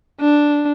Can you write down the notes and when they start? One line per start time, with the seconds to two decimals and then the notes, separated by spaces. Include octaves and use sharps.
0.21 D4